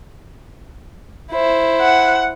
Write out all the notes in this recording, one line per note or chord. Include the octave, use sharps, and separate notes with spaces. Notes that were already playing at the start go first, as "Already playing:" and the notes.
E4 C5
F#5